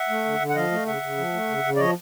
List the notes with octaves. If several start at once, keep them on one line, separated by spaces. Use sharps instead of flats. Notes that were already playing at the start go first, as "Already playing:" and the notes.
Already playing: E5 F#5
A3
D3
D3
F#5
F3 D#5 F5
A3
C#3 E5 F#5
C#3
F3
A3
C#3
C#3
D5
F3 C#5 D#5